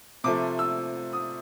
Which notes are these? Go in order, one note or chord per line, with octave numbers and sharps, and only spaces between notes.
C3 F3 A3 D6
E6
D#6